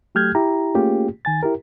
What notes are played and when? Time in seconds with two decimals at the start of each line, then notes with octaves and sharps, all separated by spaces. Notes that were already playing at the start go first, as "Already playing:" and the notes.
0.15 F#3 A3 G4 F6 G6 G#6
0.35 E4 G4 A#5
0.75 A3 A#3 C#4 F4 G4 G#4
1.25 D#3 G#5 A6
1.43 E4 G4 A#4